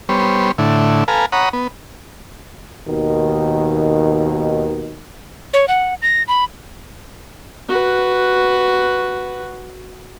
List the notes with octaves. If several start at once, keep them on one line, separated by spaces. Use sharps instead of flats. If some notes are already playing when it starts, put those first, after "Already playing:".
G3 B3 C5 C#5
A2 D3 E4
A4 B4 F5 G#5 A#5
C#5 F#5 A#5 B5 D#6
B3
D#2 B2 D#3
C#5
F#5
A#6
B5
F#4 B4